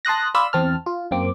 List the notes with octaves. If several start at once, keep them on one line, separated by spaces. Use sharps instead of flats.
A5 C6 D#6 F#6 A#6
D5 F5 B5 C6 E6
E2 C4 A5 F6
F4
F#2 A#3 C4 D6